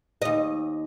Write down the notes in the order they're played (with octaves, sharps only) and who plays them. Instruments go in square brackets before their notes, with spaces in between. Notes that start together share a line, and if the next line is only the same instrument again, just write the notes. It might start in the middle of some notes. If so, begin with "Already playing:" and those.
[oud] D#2 D#5